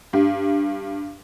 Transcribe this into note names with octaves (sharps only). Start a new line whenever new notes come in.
G2